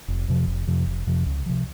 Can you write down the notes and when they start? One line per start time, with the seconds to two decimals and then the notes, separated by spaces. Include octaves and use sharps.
0.08 F1
0.28 F2 C3 F3
0.48 F1
0.67 F2 C3 F3
0.87 F1
1.07 F2 C3 F3
1.26 C#2
1.46 C3 F3